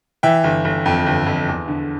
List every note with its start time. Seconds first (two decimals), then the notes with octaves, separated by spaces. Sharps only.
0.23 E3 E5 G5
0.44 G1
0.65 G1
0.86 F2
1.06 G1
1.26 F2
1.48 E2
1.68 D3